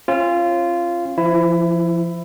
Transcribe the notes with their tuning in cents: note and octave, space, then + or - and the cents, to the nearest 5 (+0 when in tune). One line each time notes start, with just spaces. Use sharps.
C#4 -40 F4 -15
F3 -25 E4 +15